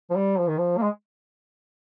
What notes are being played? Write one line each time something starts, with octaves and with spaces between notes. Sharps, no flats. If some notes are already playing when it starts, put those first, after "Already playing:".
F3
G3
F3
D#3
F3
A#3
G#3